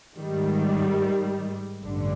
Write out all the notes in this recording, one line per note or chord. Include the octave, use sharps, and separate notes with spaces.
G#2 D#3 G3
A1 G2 D3